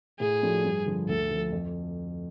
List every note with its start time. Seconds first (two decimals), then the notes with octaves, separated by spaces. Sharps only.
0.20 A2 G#4
0.43 F3 A3 D4 F#4
0.64 G2
0.86 D3 F3
1.08 D2 A4
1.31 D3 F3
1.52 F2